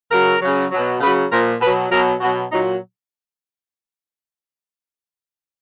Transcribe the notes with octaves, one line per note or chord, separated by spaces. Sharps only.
C#3 F#3 A#4
C#3 F#3
F#3
B2
C#3 F#3 B4
A#2 F3 A#4
B2 F#3 B4
B2 F#3 A#4
B2 F#3 F#4
A#2 F#3 D#4